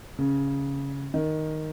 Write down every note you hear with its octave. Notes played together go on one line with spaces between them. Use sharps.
C#3
D#3